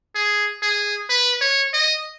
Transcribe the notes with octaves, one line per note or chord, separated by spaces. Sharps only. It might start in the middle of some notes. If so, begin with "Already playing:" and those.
G#4
G#4
B4
C#5
D#5